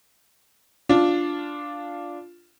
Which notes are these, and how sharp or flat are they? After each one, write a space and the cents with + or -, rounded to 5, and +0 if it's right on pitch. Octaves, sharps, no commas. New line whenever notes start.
D4 -5 F4 +0